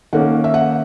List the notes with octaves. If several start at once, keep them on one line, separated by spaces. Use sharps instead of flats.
D#3 A#3 C#4 F#5
E5
F#5